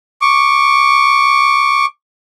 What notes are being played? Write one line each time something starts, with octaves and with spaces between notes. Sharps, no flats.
C#6 D6